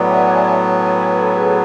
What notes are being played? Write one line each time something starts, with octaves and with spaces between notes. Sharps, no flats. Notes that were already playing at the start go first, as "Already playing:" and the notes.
Already playing: A2 F#3 B3 B4 D5 E5 F#5
G#5
A5
A5
G#5
B4
A4
G#4